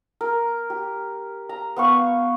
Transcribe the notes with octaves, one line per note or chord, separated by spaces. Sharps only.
A#4
G4
A#5
B3 F5 C#6